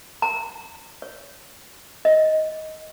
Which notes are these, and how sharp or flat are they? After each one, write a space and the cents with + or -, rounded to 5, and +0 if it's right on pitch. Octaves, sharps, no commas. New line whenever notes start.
A#5 -30
C#5 +40
D#5 +10